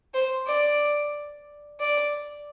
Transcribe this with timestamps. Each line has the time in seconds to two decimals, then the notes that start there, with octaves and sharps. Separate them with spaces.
0.14 C5
0.47 D5
1.80 D5